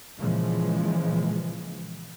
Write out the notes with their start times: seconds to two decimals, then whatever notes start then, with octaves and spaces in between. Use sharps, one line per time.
0.17 A#2 C#3 E3 F3 G#3